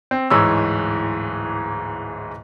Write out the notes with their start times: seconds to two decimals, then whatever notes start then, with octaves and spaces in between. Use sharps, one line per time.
0.11 C4
0.30 D1 G#2 E3 C#5 E6